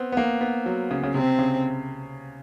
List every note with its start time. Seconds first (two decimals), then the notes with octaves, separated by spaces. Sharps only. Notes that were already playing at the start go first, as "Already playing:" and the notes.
Already playing: B3 C4
0.12 B3
0.17 A#3
0.41 B3
0.66 F#3
0.91 C#3
1.03 C#3
1.14 C3 C4
1.39 C#3